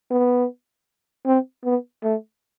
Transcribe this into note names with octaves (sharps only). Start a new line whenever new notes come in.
B3
C4
B3
A3